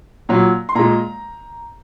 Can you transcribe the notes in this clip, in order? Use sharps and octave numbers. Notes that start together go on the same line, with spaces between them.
A#2 F#3
C6
A#2 G#3 A#5